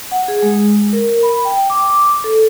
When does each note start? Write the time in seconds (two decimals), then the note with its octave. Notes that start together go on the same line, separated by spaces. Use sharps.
0.12 F#5
0.28 G#4
0.42 G#3
0.93 A#4
1.23 B5
1.45 G5
1.70 D6
2.24 A4